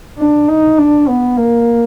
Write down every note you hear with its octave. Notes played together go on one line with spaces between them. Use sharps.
D4
D#4
D4
B3
A#3